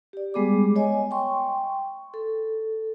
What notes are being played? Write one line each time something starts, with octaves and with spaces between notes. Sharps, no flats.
G4 D5
G3 G#3 B3 G#4 D6
C#5 D#5 G#5
G5 C6 C#6
A4